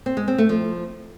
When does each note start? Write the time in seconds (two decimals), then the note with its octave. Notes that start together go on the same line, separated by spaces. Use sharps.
0.06 C4
0.17 G#3
0.28 C4
0.38 A3
0.49 F3